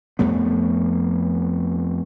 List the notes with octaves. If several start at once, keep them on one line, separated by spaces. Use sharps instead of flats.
F2 A3 B3